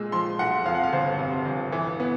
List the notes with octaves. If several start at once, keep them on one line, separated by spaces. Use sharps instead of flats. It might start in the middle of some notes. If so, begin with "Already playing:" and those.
Already playing: A#2 G#3 E6
F3 C6
B1 F#5
F2 F5
F#5
F5
G1 C5
C3
G1
E3
B3